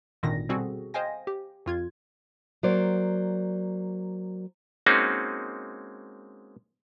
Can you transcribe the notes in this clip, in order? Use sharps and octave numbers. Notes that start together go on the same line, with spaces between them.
G#1 A#2 D3 D#3 A#6
B2 G3 C4 F#4 G#4 A4
C5 D#5 F5 G5 G#5 A#6
G4
F2 F4 G#6
F#3 A#3 C5 D5
G#3 A#3 C4 C#4 D#4 F#4